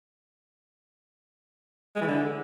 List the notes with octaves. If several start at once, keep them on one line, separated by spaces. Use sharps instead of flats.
G#3
E3
D3